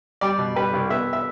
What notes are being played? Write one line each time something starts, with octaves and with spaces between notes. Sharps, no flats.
G3 D5
B2
G3 B4
C2
B3 E5
E5